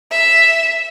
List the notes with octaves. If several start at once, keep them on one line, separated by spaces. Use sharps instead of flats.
E5